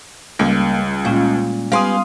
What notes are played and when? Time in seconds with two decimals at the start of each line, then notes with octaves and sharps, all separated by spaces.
0.39 C#2 G3 A#3
1.05 A#2 G#3 C#4 F4
1.72 G3 B3 G4 B4 F5 G#5 C6 D#6